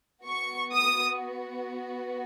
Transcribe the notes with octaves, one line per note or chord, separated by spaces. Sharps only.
B3 F#4 C#6
D#6